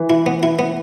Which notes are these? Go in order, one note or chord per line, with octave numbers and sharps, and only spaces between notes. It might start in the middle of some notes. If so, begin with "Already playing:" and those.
Already playing: E3
E4
B3
E4
B3